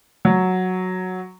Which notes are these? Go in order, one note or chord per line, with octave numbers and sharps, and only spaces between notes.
F#3